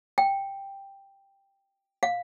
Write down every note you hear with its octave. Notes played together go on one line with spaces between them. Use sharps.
G5
F5